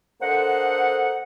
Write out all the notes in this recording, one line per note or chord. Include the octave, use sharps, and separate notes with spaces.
D3 A#3 A4 C5 D#5 F#5